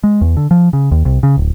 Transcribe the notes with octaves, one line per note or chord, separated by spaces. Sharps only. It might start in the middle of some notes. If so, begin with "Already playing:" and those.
G#3
E2
D3
F3
C#3
D#2
C2
C#3
D1